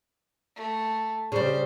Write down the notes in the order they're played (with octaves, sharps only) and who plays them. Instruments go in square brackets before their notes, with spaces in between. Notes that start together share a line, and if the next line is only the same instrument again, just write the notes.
[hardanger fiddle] A3
[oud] C#3 G3 [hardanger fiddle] C5